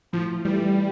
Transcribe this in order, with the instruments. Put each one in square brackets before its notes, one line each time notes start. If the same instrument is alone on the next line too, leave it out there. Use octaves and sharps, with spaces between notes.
[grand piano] A2 [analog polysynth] F3
[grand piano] E3 A3 E4 [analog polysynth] G3